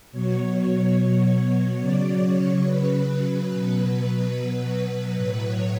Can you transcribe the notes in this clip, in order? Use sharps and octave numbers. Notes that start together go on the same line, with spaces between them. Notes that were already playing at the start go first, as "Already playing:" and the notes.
B2 F#3 C#5
C#3 F#3 D5
C#5
B4
B2 F#3
A2 F#3 B4
C#5